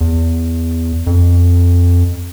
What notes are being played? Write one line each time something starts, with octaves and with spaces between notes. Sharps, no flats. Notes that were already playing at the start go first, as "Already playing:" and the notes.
E2
F2